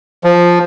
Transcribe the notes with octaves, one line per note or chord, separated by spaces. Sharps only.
F3